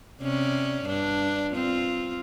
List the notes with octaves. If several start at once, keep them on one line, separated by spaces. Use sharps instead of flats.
C3 C#4 D5
G2 D4
C4 F4